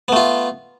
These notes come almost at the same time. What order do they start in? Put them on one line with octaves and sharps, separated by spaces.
B3 A3 F4